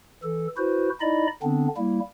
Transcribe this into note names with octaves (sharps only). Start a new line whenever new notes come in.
E3 A4
E4 F#4 B4 C5
D#4 E4 D5 D#5 B5
D3 B3 C4 D4
G3 A#3 E4